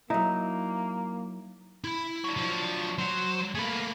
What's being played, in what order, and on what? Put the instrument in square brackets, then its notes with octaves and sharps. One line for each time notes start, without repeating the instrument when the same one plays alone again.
[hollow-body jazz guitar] F#3 E4 [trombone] A#3 [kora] D#4
[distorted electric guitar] E4 B5
[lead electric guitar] F#3 D4
[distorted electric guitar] F3
[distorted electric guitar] F#3 [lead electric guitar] C5
[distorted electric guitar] A3 A#3 [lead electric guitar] G#4 B4